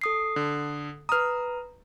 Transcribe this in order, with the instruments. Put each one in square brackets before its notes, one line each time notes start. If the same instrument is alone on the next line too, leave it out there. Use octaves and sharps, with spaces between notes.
[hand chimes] A4 D#6 C7
[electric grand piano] D3
[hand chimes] B4 A#5 [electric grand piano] D#6 F6